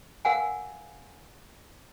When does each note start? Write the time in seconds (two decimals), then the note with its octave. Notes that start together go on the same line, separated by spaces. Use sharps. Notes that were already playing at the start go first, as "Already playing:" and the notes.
0.25 A#4 F5 F#5 G#5